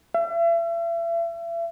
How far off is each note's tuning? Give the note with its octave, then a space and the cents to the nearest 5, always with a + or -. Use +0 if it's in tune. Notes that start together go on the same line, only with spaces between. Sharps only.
E5 +40